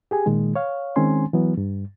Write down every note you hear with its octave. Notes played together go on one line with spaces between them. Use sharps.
G4 G#4 G#5
A#2 D#3 G#3
C#5 F5
D#3 G#3 C4 C#4 G#5 C6
E3 F#3 B3
G2